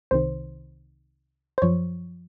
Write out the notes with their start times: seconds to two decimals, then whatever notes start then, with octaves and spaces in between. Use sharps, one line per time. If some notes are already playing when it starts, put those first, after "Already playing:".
0.11 C2 C3 D#3 C5
1.58 C5
1.62 F#2 F3 C#5